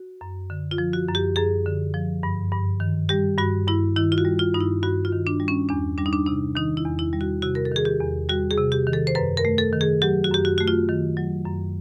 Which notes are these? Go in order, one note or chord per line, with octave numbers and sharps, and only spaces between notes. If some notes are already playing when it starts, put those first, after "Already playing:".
Already playing: F#4
F#2
D3
F4
F3
F#4
F#2
G4
F#2 G#4
D3
F3
G2
G2
D#3
G3 G4
G2 F#4
G2 E4
D#3 E4
F4
F#4
G3
F4
G2 D#4
E4
G2 F#4
F4
D#3
D4
G3
C#4
E2 D4
G3 D4
D#4
D4
C3 D#4
D#3 D#4
E4
E2
E4
G3
F#4
C3 F#4
A#4
A4
D#3 G#4
G4
E2
G3 F#4
G#4
C3
G4
D#3
A4
C5
F#2 B4
A#4
A3
A4
D#3
G#4
F#3 G4
F#4
F#2 G4
F#4
A3 F#4
F4
D#3
F#3
F#2